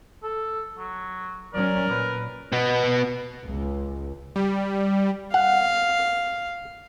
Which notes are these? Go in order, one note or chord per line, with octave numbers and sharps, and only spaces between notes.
A4
F#3
F#3 C#4 A#4 D5
A#2 B4
B2 B3
C#2
G3
F5 F#5